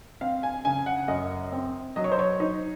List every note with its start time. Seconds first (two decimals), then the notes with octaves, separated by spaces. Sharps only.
0.21 C4 F5
0.43 G#5
0.65 C#3 G#5
0.79 G#5
0.86 F#5
1.08 F#2 D#5
1.52 C4
1.96 F#3 D#5
2.04 C#5
2.12 C5
2.19 C#5
2.40 D#4